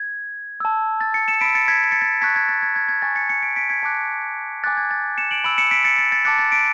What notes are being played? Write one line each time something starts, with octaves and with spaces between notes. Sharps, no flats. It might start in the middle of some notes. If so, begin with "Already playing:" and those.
Already playing: G#6
A5 E6
A6
A6 C#7
C#7 E7
B5 E6 B6 D7
A6 C#7
G#6 B6
A6 C#7
A6 C#7
A5 C#6 F#6 G#6 B6
G#6 B6
A6
G#6
G#6
G#6
G#5 C#6 F#6 A6
A6 C#7
A6 C#7
B6 D7
B6 D7
G#6 B6
A5 D6 F#6
G#5 D6 F#6 A6
G#6
A6
C#7 E7
D7 F#7
B5 E6 D7 F#7
C#7 E7
B6 D7
A6 C#7
A6
A6
A5 D6 F#6 A6 C#7
A6 C#7
B6 D7